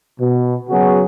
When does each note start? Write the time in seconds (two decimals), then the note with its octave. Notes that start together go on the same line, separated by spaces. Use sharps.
0.19 B2
0.69 C#3 F#3 B3 F#4 G#4